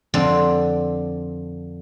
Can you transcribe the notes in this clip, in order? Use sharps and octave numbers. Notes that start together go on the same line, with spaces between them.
F2 D3 C4 D5